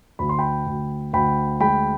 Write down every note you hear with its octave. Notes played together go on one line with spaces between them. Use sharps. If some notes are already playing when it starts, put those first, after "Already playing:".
D2 B5
C6
G5 B5
D2
D2 G5 B5
G#3 G5 B5